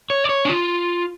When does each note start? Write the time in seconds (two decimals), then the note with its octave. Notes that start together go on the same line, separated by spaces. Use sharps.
0.10 C#5
0.24 D5
0.29 C#5
0.45 D4
0.49 F4